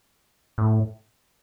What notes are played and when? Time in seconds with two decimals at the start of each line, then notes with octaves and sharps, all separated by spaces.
0.58 A2